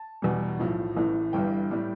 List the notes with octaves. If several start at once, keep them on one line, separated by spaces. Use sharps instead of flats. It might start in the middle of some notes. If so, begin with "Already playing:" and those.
Already playing: A5
E2 B2 G3
B1 A2 F3
A1 A2 E3
G1 G2 E3 G3 G5
A2 G3